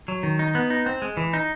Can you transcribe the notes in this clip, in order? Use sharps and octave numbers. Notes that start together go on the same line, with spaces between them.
F#3
D#3
D#4
B3
D#4
C4
G#3
E3
D#4